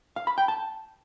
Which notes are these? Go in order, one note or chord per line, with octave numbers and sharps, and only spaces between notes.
F5
B5
G5
A5